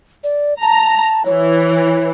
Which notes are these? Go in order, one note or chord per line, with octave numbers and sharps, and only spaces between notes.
D5
A5 A#5
E3 C#5